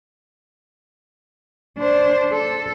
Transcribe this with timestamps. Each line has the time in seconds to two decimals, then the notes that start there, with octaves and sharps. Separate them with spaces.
1.78 D4 C5
2.33 A4